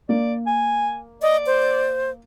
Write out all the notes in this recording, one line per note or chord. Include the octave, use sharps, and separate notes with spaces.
A#3 D5
G#5
D5 D#5
C5